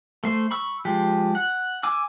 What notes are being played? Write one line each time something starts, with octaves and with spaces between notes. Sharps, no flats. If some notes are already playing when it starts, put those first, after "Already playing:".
A3 C5
B5 C#6 E6
F3 G#3 G4
F#5
G#5 D6 E6